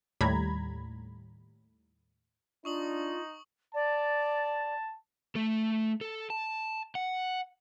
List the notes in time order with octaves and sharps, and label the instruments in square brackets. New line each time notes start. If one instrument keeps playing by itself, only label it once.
[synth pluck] D#2 A2 G3 A#5 B5 G#6
[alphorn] D4 [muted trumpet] D#4 [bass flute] F4 [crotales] C#6 D#6 F#7
[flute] D5 [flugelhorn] A5
[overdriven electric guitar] A3 A4
A4
A5
F#5